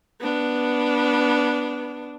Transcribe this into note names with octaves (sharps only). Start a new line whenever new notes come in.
B3 D4